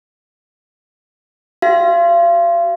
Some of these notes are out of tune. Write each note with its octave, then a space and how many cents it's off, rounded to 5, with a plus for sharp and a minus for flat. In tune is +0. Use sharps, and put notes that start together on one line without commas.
F#4 +35 F5 -35